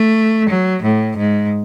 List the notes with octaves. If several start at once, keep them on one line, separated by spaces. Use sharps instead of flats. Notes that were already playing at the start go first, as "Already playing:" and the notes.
Already playing: A3
F#3
A2
G#2